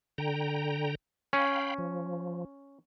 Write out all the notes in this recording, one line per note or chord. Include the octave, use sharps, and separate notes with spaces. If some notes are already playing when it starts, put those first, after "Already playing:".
D3 G5 A#5
C#4 F5 G5 B5
F3